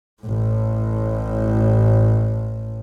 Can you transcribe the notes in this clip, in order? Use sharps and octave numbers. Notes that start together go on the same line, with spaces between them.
A1 A2